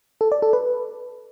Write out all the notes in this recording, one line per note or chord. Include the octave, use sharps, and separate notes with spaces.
A4
D5
A4
B4